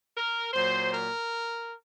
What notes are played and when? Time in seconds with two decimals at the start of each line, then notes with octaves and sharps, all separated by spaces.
0.15 A#4
0.53 A#2 F#3 C5
0.92 A#4